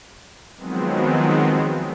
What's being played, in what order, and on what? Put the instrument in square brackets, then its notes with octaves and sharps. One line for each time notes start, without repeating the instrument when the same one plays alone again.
[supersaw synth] D#3 F3 F#3 G#3 B3 C4